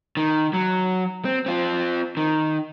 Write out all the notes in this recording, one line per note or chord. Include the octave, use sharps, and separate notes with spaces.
D#3
F#3
C4
C4 F4
D#3